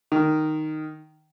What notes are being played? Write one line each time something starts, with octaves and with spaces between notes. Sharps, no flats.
D#3